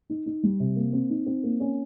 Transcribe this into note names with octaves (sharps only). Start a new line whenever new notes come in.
D#4
D#4
G3
C3
A#3
C4
D#4
C4
A#3
C#4